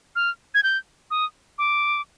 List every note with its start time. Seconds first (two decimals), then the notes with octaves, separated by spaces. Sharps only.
0.16 F6
0.54 G#6
0.63 G6
1.11 D#6
1.58 D6